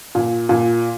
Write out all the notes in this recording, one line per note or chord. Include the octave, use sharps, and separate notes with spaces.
A#2
A#2